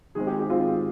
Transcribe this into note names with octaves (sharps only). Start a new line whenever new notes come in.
D#3 G#3 C4 G#4
G4
G4
D#3 G#3 C4 F4